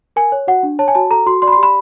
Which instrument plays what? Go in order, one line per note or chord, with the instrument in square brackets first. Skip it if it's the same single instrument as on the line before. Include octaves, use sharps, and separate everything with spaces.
[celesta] A#4 G#5
C#5
F#4 F#5
D4
C#5 A5
G#5
F#4 A5
A4 A#5
F#4 C6
D5 C6
B5
C6
G4
B5